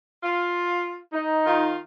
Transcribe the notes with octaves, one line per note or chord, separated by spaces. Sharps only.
F4
D#4
D#3 F4